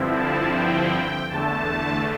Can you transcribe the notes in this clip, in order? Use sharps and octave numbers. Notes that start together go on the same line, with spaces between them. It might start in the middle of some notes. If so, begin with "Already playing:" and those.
Already playing: G2 D3 F3 C4 E4
A5
G5
E2 D3 A3 A5